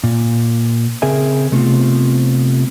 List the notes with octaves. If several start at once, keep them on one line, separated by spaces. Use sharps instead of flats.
A#2
C#3 C4 G#4 A#4 E5 G#5
C3 A3 B3 C4 F4